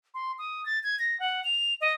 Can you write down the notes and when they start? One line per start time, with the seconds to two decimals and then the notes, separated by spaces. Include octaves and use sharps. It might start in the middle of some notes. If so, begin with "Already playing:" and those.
0.14 C6
0.39 D#6
0.66 A6
0.83 G#6
0.99 A#6
1.20 F#5
1.44 F7
1.81 D#5